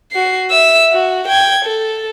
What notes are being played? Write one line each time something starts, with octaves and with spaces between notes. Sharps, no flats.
F#4 C7
E5 E6
F#4
G5 G#6
A4